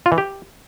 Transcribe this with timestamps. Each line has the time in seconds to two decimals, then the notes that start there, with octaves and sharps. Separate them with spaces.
0.06 F4
0.12 E3
0.18 G4